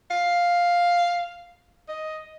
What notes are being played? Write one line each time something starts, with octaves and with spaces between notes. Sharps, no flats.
F5
D#5